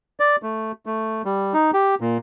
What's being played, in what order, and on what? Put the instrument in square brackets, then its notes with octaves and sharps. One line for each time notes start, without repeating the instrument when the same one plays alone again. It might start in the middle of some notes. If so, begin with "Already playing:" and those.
[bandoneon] D5
A3
A3
G3
D#4
G4
A#2